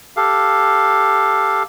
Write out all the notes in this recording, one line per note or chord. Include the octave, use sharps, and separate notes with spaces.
G4 A4 F5